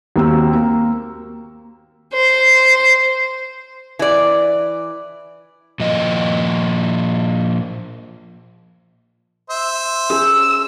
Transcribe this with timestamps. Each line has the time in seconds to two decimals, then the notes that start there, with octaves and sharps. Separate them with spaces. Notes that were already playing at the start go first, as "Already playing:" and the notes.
0.16 D#2 A#3 C4 F#4 G5 E6
0.55 A#3
2.15 C5
3.99 E3 D5
5.80 A#2 F3 D#5
9.50 C5 E5
10.10 C#4 G#4 E6